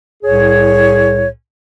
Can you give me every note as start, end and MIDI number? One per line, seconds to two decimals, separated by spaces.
0.23 1.26 36
0.23 1.26 45
0.23 1.26 68
0.23 1.26 73